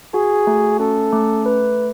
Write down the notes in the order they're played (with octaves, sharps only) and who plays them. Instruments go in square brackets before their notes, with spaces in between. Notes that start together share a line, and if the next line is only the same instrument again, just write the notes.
[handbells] F#4 [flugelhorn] G#4
[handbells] A3
[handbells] C#4 [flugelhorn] A4
[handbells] A3
B4